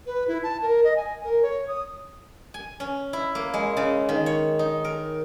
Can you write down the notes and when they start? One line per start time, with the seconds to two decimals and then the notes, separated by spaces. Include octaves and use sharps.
0.06 B4
0.28 E4
0.43 A5
0.62 A#4
0.84 D#5
0.96 G#5
1.24 A#4
1.42 C#5
1.68 D#6
2.54 G#5
2.80 C#4
3.13 E4
3.35 A#3
3.54 G#3
3.77 C#3
4.09 D#3
4.26 C#5
4.59 D#4
4.85 A#4